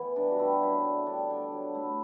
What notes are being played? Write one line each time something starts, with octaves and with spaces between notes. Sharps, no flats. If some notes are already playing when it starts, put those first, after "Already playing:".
Already playing: E3 B3
G2 D4
F#4
G3 E4
F#2 E4
D3 D4
G3 D4
D3 D4
F#3
A3 E4